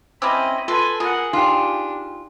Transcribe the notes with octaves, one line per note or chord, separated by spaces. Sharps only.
C4 C#4 E4 D#5 B5 D6 E6
F4 A4 B4 G#5 C6
F4 G#4 A#4 F#5
D4 D#4 F4 G4 G5